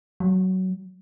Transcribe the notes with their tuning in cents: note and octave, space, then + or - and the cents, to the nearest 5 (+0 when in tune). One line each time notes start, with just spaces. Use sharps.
F#3 +15